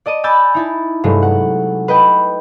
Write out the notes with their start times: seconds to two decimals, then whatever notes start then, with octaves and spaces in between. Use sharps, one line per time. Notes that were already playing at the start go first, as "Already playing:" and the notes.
0.06 D5 D#5 A5 D#7
0.24 G#5 B5 D6 E6 G6 A6
0.54 D#4 E4 A5
1.04 G2 C3 F#3 G#3 A3
1.22 F#5
1.88 B4 D#5 G5